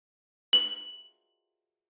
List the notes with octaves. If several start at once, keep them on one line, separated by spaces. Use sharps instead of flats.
F#7